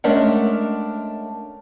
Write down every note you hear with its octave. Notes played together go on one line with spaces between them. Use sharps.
G#3 A3 C#4 D4 A#4 F#5